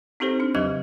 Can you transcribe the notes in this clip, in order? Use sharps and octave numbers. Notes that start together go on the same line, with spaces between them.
C4 D#4 G4 A4 C5
D4 F6
E2 C#3 F#3 G4 D#5 G#6